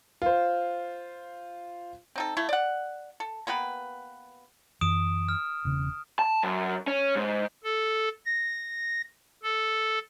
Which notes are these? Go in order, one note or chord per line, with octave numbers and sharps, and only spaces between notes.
F4 C5
C4 D#4 A4
A3 E4 F5
D5 F#5
A4
A#3 B3 G4 B4
F#2 E3 D#6 D7 E7
F6
E1 C#3
A5
F#2
C#4
G#2
A4
A#6
A4